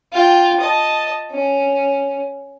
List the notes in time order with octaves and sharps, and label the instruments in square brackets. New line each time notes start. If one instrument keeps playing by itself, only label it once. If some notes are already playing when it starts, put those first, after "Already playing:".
[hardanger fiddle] F4 G5
D#5 A5
C#4